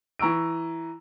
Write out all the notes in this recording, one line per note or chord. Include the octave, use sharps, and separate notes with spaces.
E3 A#5 C#6 E6 D7